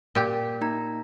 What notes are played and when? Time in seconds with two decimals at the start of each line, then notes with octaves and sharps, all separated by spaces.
0.15 A#2 G4
0.61 A#3 D#4 A#5